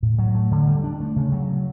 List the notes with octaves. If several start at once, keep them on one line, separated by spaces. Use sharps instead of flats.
A2
F#3
A3
D3
G3
D4
A3
C#3
F#3